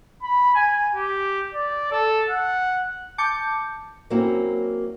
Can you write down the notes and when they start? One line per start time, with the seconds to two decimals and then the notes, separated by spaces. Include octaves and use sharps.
0.22 B5
0.54 G#5
0.94 G4
1.53 D5
1.91 A4
2.29 F#5
3.18 A5 D6 G6 C#7
4.10 F#3 A#3 C4 C#4 E4 F#4